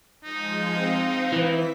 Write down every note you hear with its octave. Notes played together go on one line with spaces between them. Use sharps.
F3 G#3 D#4 G6
C4 F5
E3 E5 B6